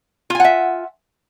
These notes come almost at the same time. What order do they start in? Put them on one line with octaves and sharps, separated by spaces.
F4 G#5 F#5 E5